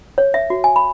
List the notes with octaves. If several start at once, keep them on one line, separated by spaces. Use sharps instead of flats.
C#5
E5
F#4
G#5
B5